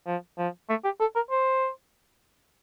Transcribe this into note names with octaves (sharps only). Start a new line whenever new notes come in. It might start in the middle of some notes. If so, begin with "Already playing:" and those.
F3
F3
A3
G4
A4
A#4
C5